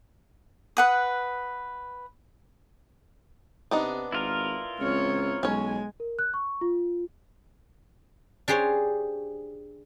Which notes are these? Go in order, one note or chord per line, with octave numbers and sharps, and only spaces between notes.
B4 F#5 D#6
C3 B3 D4 D#4
G#1 E4 F4 A#4
C#2 C4 C#5
B1 G#3 C#4 C#5 G#5
A#4
F#6
C#6
F4
D4 G4 G#4 C5 C#5